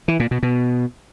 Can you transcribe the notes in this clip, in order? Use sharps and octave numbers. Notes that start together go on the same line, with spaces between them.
E3
A#2
B2
B2